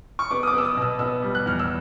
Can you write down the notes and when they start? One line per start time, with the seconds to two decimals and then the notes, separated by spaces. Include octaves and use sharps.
0.19 C#6
0.31 B3 D6
0.43 D#6
0.47 D6
0.53 B3 E6
0.65 D#6
0.77 B2 E6
0.99 B3 E6
1.22 G3
1.35 F#6
1.46 E2 F6
1.59 E6